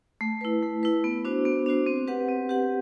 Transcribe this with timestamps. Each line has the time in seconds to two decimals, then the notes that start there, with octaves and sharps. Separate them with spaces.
0.21 A3
0.41 E4 B4
0.63 A3
0.83 E4 B4
1.04 B3
1.25 D4 F#4 C5
1.45 B3
1.66 D4 F#4 C5
1.86 C4
2.07 G4 B4 F#5
2.29 C4
2.49 G4 B4 F#5